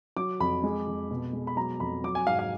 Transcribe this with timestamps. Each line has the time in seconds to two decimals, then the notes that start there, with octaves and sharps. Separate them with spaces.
0.16 F#3 D6
0.40 F2 B5
0.63 G#3
0.87 F2
1.11 B2
1.33 G#3
1.47 B5
1.57 F#3 A#5
1.80 F2 B5
2.04 F#3 D6
2.15 G#5
2.27 G#2 F5
2.39 F5